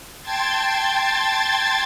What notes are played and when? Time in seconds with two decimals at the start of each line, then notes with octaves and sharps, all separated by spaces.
0.23 G5 A5 C6 G#6 A6